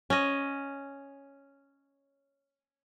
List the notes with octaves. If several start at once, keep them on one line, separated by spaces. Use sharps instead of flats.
C#4 D#5